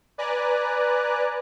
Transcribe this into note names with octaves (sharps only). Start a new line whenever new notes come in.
B4 D5 G#5 A#5 F#6